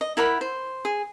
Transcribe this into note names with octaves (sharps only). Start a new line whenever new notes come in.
D#5
E4 A#4 F#5 B5
C5
G#4